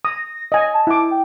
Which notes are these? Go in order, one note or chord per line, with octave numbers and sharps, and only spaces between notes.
D#6 A#6
D#5 G#5
A5
E4 D6
G5